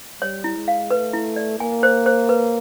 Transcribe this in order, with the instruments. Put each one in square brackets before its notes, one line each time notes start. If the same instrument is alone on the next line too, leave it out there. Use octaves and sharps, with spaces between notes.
[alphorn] G3 [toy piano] C#5
[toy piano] E4
[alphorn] G#3
[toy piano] F5
[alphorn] A3 [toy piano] B4
[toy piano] E4
D5
[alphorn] A#3 [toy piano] G#5
[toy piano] C5
C5
B4